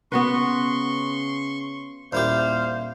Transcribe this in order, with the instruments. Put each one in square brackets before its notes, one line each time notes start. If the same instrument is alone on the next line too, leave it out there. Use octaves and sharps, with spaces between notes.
[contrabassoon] C#3 [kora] B3 F#4 B4 [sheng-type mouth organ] C6 C#6
[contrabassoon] D#1 [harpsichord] A#2 E4 G4 [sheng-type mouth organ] C5 F5